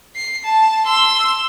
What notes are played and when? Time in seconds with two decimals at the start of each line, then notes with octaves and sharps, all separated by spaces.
0.16 C7
0.45 A5
0.87 C6 E6